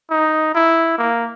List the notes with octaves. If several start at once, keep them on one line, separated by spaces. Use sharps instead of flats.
D#4
E4
A#3